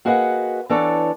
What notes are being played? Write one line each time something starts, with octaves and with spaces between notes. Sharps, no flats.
A#3 F#4 G#4 B4 D#5 F#5
E3 B3 D4 A4 C#5 D5